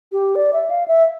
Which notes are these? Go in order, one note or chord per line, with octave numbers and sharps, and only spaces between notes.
G4
D5
E5
F5
E5